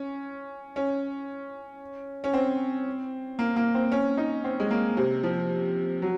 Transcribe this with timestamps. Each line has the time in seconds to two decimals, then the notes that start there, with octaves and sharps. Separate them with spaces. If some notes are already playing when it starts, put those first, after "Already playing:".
Already playing: C#4
0.76 C#4
2.24 C#4
2.33 C4
3.39 A#3
3.56 A#3
3.74 C4
3.92 C#4
4.17 D#4
4.44 C4
4.60 G#3
4.71 A#3
4.97 C3
5.23 F3
6.02 F#3